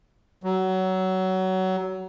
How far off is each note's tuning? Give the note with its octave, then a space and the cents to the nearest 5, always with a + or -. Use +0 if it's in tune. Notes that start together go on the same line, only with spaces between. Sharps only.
F#3 +20